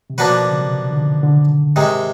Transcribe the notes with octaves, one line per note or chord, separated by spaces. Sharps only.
C3
B2 F3 A#3 D4 F#4 B4
C#3
C3
D3
D#3
D3
G#2 C3 D#3 G#3